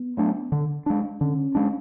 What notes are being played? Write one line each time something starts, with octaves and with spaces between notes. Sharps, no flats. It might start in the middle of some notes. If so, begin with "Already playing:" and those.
Already playing: B3
F#3 A3 D4
D3
G#3 D4
D3 C#4
G#3 D4